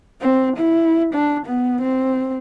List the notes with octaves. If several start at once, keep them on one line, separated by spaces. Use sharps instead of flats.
C4
E4
D4
B3
C4